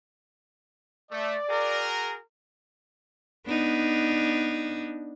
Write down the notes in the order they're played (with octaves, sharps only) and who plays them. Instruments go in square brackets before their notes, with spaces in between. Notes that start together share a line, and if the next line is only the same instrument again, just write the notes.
[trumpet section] A3 [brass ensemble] D5
[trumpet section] F#4 G#4 A#4
[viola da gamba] B3 D4 D#4